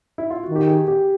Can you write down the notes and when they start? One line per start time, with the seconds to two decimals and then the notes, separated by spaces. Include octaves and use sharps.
0.18 E4
0.30 F4
0.43 F#4
0.49 D#3
0.56 G4
0.68 G#4
0.88 G4